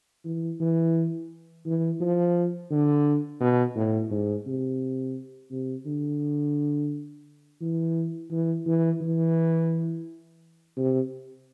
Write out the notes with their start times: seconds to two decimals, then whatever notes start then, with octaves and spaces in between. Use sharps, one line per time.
0.25 E3
0.60 E3
1.66 E3
2.00 F3
2.70 D3
3.40 B2
3.76 A2
4.10 G#2
4.46 C3
5.51 C3
5.86 D3
7.61 E3
8.31 E3
8.66 E3
9.01 E3
10.76 C3